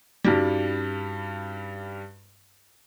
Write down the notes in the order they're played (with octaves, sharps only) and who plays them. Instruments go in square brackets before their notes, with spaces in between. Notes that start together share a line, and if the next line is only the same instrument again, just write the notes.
[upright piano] G2 G3 [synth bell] C#4 D#4 F#4